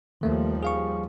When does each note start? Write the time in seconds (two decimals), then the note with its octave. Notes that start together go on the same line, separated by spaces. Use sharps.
0.21 D#2 D#3 F3 G3 A3 A#3
0.63 G#4 F5 C#6